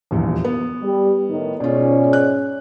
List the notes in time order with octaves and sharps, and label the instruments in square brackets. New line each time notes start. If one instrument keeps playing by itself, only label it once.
[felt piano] D#1 A#1 E2
B3
[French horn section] G3
A2 D#3
[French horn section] G#2 C#4 D5 [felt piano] B2 F4
[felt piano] F#6